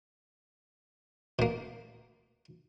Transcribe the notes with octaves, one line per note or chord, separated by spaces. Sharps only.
B2 A#3